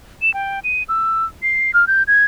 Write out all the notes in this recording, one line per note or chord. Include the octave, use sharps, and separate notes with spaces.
E7
G5
D#7
E6
C7
F6
G6
G#6